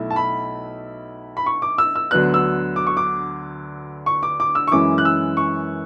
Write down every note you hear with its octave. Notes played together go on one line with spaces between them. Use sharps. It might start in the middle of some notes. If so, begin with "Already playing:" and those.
Already playing: B1 A3 E4
A5
B5
B5
C#6
D6
E6
E6
D2 D3 F#3 B3 D4 F#6
E6
D6
C#6
D6
C#6
D6
D6
E6
C#6
F#2 E3 G#3 C#4 E4 D6
F#6
E6
C#6